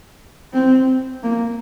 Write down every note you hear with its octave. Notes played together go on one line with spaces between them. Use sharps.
C4
A#3